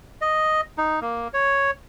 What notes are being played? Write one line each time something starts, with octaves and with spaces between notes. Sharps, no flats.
D#5
D#4
A#3
C#5